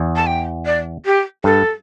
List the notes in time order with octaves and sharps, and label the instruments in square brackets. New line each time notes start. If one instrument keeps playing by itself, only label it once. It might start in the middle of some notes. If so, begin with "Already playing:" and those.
Already playing: [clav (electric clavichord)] E2
[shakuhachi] A5
G5
D5
G4
[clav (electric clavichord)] G2 [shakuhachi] A4